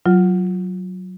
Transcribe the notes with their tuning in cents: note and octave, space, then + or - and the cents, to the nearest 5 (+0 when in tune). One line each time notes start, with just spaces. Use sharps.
F#3 +0 F4 +0